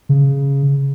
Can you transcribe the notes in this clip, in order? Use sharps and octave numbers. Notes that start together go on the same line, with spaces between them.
C#3